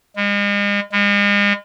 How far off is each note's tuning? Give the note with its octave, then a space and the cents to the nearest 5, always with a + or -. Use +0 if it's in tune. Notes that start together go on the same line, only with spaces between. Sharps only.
G#3 -40
G#3 -40